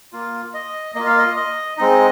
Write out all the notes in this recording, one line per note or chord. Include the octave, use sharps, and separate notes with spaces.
A#3 F4
D#5
A#3 F4 D#5
F5
D#5
D#5
G#3 C4 D#4 D#5